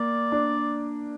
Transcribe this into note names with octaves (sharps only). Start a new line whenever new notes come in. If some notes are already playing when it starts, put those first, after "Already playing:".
Already playing: A#3 D5
D4